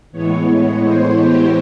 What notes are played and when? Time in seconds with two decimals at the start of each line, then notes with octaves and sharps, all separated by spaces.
0.12 A2 E3 G#3 B3 C#5
0.83 C5
1.19 G4